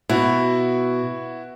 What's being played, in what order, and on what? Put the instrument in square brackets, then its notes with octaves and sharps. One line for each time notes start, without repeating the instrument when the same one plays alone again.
[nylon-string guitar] B2 [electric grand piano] E4 F#4